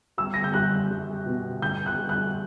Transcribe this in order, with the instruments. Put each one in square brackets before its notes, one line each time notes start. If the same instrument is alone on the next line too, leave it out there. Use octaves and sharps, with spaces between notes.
[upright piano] G3 E6
A#6
G6
G3 F#6
G3
B2
G2 G6
F#6
G3
F#6